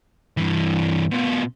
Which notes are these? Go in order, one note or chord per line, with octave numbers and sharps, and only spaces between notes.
G2 E3
B2 F4